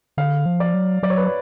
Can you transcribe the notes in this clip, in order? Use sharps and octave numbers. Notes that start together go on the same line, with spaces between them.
D3 F5
F3
D5
F#3
F#3 D5
C#5
B4
C#5